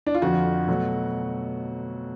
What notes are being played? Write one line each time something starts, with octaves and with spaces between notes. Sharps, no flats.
D4
F4
F2 D3 F3 F#4
B2 F#3 A3